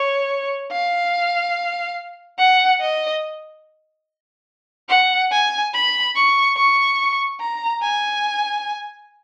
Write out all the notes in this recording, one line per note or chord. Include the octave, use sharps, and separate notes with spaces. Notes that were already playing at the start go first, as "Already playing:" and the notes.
Already playing: C#5
F5
F#5
D#5
F#5
G#5
B5
C#6
C#6
A#5
G#5